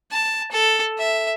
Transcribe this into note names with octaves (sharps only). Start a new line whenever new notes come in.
A5
A4
E5